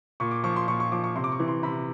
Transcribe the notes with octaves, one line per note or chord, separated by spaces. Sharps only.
A#2 C#6
D6
F3 C#6
C6
A#2 C#6
C#6
F3 D6
C#6
C3 C6
D6
C#6
E3
C6
C3 B5